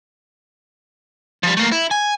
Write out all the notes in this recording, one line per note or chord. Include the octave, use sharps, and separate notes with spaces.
F3 G3
A3 A#3
E4
G#5